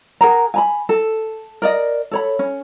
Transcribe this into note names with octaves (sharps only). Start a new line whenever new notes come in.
G#4 A#4 F#5 A#5
G#5 A#5 B5
A4
A#4 D5 D#5
A4 C#5 B5
C#4